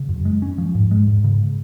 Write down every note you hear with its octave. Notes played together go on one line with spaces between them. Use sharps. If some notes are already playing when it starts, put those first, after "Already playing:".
Already playing: C#3
F#2
G#3
C#4
F3
G#2
G#3
G#2
C#3